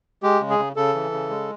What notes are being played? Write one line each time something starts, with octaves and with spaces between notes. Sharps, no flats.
G#3 G4
C#3
G#4
C#3
C#3 A4
E3
C#3
G#3